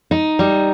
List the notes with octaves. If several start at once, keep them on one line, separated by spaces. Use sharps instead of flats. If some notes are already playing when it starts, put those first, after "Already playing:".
D#4
G3